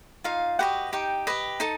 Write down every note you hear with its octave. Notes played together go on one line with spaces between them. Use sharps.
D#4 F4 F5
F#4 G4 B4 D#5 F#5
D#4 G4 G5
G4 B4 D#5
D#4 A4 A5